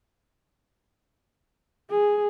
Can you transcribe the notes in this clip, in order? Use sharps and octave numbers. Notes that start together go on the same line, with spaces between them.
G#4